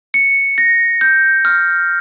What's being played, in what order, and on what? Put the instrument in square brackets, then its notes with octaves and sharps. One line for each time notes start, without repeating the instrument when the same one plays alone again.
[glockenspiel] C#7
A#6
G6
F6